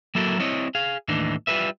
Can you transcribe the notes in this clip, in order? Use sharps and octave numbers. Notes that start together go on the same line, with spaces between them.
F#3 A#3 E4 F#4 A4 A#4
G3 C4 E4 C#5 D#5
G#4 F5
D#2 A2 E3 D4 D#4
G3 F4 A#4 B4 E5